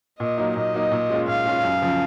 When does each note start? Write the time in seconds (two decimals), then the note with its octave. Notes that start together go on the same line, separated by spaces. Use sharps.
0.19 A#2 D#5
0.38 F#3 A#3 D#4
0.56 A#2 D#5
0.74 F#3 A#3 D#4
0.91 A#2
1.10 G#3 C#4 F4
1.27 A#2 F5
1.46 G#3 C#4 F4
1.63 F#2
1.82 C#3 F3